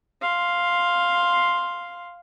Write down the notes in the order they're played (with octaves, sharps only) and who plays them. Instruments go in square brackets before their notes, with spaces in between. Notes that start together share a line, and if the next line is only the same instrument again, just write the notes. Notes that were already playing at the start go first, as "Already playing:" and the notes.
[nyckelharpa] F5 C6